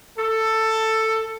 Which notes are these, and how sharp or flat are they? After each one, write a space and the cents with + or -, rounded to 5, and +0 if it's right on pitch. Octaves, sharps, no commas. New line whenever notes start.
A4 +10